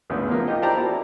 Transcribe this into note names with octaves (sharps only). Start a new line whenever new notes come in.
G#1 D2 C#3 B3 E4
E2 F3 A#3
D#4 F4 G4 D#5
E4 G4 C5 D5 A5 A#5
A#3 E4 F#4